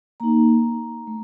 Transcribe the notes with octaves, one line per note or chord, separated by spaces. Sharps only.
A#3 D#4 A#5
A3